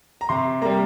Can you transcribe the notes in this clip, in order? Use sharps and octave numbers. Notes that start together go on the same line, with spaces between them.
A#5
C3 C6
G3 A#3 A#5